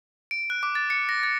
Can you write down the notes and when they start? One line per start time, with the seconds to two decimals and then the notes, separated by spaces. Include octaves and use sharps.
0.31 D7
0.50 F#6
0.63 D6
0.75 A6
0.90 C#7
1.09 A#6
1.23 A6